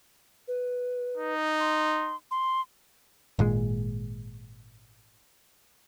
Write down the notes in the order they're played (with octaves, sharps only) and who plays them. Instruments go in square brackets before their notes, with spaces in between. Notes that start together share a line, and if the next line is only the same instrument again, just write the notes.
[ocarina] B4
[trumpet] D#4
[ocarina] C6
C6
[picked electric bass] G#1 A#2 G#3